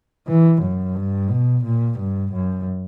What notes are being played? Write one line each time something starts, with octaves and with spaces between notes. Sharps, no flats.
E3
F#2
G2
B2
A#2
G2
F#2